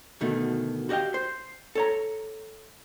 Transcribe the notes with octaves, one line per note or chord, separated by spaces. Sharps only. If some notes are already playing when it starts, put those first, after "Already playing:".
D2 B2 D#3 A3
F#4 G4 D#5 F5 G5
C5
A4 C#5 A#5